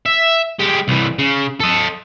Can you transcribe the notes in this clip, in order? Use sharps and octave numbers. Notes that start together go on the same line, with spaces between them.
E5
G#3 G4
C2 E3
C#3
A4 D#5